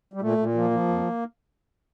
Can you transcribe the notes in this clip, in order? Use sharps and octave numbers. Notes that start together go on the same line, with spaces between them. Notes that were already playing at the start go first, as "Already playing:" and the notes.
G3
A#2 A3
A#2
F3 A#3
F3
F2